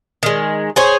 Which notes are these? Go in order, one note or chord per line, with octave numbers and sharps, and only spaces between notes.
D#3 G#3
G#4 C5 C#5